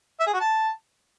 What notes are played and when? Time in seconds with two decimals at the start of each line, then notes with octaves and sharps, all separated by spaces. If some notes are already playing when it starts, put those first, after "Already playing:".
0.20 E5
0.27 G#4
0.33 F#4
0.40 A5